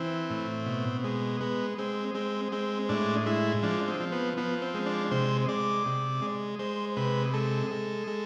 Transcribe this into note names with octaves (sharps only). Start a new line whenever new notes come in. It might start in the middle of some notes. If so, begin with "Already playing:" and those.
Already playing: E3 C4
A2
B2
G#3
G#3 B3
G#3 C4
G#3 C4
G#3 C4
A2 D4
G#3 E4
F3 D4
C4
F3
B3
F3 B3
C4
G#3
D4
C3 C5
G#3 D5
C3
G#3
G#3 C5
C3 B4
G#3 A4
G#3
G#3